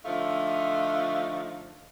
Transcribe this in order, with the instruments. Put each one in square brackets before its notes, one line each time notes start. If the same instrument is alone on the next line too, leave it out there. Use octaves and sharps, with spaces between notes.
[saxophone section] D3 F3 A3 D#4 F5